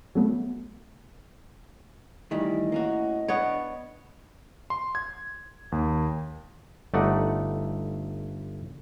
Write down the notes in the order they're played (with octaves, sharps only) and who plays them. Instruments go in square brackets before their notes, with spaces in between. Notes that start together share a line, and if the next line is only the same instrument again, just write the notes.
[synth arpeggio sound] F#3 G3 A3 B3
[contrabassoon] A2 [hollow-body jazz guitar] D#3 E3 G3 [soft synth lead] D#5
[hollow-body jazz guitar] A#3 C#4 F#4
[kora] B3 C#5 [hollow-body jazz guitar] D4
[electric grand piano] C6
G#6
D#2
[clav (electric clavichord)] G1 A3 D#4 D5 F#5